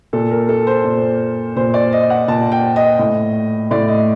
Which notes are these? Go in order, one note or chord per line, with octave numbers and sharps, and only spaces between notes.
A#2 A4
A#4
A4
C5
A#2
A#2 C5
D5
D#5
F#5
A#2 A5
G5
D#5
A2
A2 D5
D#5